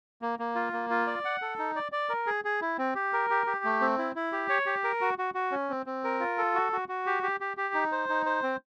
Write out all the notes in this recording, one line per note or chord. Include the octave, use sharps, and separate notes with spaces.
A#3
A#3
F4
A#3
F4
D5
F#5
A4
D#4
D5
D5
A#4
G#4
G#4
E4
C4
G4
A#4
G4
G4
A3
C4
E4
E4
G4
C#5
G4
A#4
F#4
F#4
F#4
C#4
C4
C4
A#4
F4
A4
F#4
F#4
F#4
G4
G4
G4
G4
D#4
C5
D#4
C5
C4